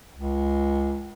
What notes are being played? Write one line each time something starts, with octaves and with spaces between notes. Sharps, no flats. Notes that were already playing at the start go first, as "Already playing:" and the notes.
C#2